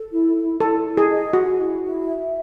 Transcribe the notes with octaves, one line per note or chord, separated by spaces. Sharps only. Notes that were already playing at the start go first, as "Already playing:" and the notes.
Already playing: A4
E4
E4
E4 A4
E4
G#4
D#5
F#4 G#4
E4
E4
E5